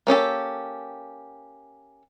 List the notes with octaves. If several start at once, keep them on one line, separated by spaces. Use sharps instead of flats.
A#3 C#4 G4 A4